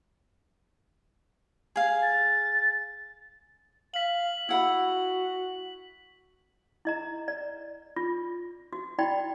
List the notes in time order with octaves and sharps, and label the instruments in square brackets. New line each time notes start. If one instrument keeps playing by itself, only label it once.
[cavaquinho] G#4 F5
[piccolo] A6
[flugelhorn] F5 [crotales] B6 F#7
[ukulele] E4 F#5 B5 [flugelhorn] F#4
[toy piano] E4 D#5 A#5
D5
F4
F#4
E4 F#4 D5 G5 B5